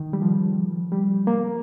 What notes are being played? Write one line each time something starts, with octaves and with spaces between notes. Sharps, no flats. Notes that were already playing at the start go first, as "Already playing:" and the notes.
Already playing: D#3
G3
F3
G3
A#3